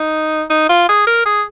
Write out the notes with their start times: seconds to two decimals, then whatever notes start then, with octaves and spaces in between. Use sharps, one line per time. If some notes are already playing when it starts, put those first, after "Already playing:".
Already playing: D#4
0.50 D#4
0.69 F4
0.89 G#4
1.07 A#4
1.26 G#4